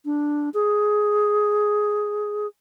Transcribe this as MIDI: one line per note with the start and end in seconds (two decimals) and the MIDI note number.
0.05 0.49 62
0.54 2.47 68